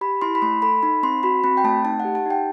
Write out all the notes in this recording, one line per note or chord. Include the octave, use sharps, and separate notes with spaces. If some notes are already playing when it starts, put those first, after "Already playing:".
G4 B5
E4 C6
B5
A3 C6
A4 B5
D#4 B5
C4 C6
F#4 B5
C4 B5
G5
A3 A5
D#4 A5
F#5
G4
A5
D#4 G5